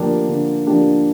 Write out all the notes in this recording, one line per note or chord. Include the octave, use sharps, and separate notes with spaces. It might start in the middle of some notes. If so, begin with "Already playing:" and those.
Already playing: D3 F3 A#3 D4 G4
D3
F3 A#3 D4 G4